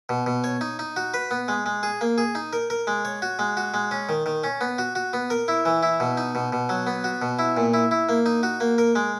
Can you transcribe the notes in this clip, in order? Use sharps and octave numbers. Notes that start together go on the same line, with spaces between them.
B2
B2
C#5
D#4
D#4
F#4
B4
B3
G#3
G#3
G#4
A#3
G#4
D#4
A#4
A#4
G#3
C#5
F#4
G#3
F#4
G#3
C#4
D#3
D#3
C#4
B3
F#4
F#4
B3
A#4
E4
E3
E4
B2
D#4
B2
B2
F#3
B3
F#4
B2
E4
A#2
E4
E4
A#3
D#4
F#4
A#3
A#4
G#3